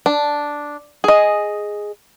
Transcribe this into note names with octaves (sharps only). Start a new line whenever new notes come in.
D4
G#4 D#5